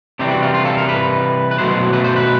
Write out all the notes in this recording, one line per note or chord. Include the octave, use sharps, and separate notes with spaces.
C3 E3 G3 C4 G4
F#4
F4
F4
A4
A#4
B4
B4
B2 F#3 A3 C5
B4
C5
B4